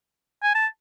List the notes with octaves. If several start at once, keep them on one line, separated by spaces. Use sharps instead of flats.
G#5
A5